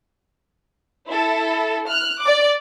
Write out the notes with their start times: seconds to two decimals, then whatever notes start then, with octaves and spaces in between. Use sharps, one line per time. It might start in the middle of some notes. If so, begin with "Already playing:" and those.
1.08 E4 A4
1.89 F6 F#6
2.22 D5 D6